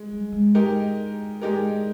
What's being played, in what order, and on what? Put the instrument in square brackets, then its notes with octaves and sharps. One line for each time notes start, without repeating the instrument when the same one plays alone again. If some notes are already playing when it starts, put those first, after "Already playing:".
Already playing: [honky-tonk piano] G#3
[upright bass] G3
G#3
[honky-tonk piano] G#3 D#4 G4 A#4
G#3 D#4 G4 A#4